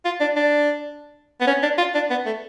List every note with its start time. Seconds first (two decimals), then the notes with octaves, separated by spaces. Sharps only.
0.05 F4
0.21 D4
0.36 D4
1.41 B3
1.47 C#4
1.62 D4
1.78 F4
1.94 D4
2.10 B3
2.26 A3